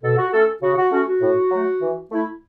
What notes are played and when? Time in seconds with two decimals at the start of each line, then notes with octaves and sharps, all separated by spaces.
0.03 B2 A4
0.17 F#4
0.33 A3 C#4 A4
0.62 C#3 F#4
0.77 F#4
0.92 A3 C#4 F#4
1.07 F#4
1.21 A2
1.51 F#3 A3
1.81 E3
2.11 A3 E4